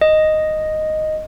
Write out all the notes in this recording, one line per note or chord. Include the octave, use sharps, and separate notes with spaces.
D#5